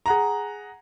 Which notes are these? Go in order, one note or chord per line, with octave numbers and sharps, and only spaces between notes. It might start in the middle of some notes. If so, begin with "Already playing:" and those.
G#4 F#5 A#5